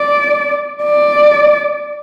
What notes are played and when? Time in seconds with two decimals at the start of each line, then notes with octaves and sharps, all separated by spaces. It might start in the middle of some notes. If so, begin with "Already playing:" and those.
Already playing: D5
0.84 D5